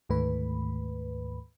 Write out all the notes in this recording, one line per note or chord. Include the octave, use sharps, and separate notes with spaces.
D2 G#2 D#3 A3 B4 B5